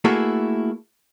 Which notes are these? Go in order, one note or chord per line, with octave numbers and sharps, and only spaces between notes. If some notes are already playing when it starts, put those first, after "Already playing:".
A3 A#3 E4 F#4 G#4 A4